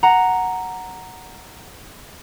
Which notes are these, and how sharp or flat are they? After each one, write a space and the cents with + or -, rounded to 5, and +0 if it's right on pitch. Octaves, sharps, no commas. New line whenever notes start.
F#5 +0 A#5 +0